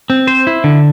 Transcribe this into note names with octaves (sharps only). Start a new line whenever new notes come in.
C4
C5
E4
D3